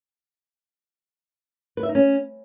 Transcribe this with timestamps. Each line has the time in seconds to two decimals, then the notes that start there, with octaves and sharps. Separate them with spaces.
1.77 B4
1.83 E5
1.89 D#4
1.95 C#4